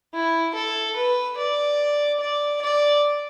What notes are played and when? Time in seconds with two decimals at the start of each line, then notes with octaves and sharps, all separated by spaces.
0.14 E4
0.55 A4
0.96 B4
1.38 D5
2.20 D5
2.61 D5